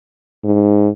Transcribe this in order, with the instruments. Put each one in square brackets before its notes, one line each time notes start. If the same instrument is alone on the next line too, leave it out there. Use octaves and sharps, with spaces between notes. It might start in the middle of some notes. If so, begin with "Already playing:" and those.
[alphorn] G#2